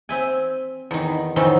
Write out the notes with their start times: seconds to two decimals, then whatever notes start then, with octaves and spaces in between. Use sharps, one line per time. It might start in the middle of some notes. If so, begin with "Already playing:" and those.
0.09 C4 E5 G#5
0.91 E2 D#3
1.36 F2 D#3 E3 F#3 C4 C#4